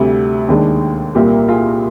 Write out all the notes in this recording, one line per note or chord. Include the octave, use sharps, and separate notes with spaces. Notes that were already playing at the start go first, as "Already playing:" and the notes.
Already playing: D2 C3 G3
D#2 D#3 G#3 D4
C2 A#2 G3 A#3 G4 A#4
F4 G#4